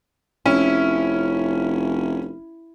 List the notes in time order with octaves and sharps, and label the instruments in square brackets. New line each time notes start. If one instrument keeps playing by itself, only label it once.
[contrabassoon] F1 [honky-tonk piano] C#4 [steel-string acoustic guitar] E4